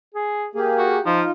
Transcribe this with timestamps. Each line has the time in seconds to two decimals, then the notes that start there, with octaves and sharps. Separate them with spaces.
0.14 G#4
0.55 A#3 G4 G#4
0.78 F#4
1.06 F3 D#4 F4